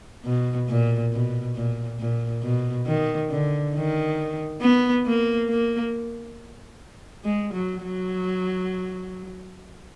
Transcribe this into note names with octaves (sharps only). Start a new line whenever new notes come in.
B2
A#2
B2
A#2
A#2
B2
D#3
D3
D#3
B3
A#3
A#3
G#3
F#3
F#3